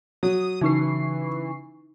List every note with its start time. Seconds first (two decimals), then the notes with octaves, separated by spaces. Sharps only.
0.23 F#3 D#6
0.61 C#3 E3 D#4 B4 C#6 C7